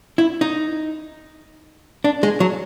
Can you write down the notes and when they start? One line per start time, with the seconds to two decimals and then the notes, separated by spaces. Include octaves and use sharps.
0.18 E4
0.41 D#4
2.04 D4
2.23 G#3
2.40 F#3